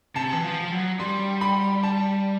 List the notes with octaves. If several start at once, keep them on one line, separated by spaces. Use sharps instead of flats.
C3 A5
E3
F3
F3
F#3
G3 C6
B5
A5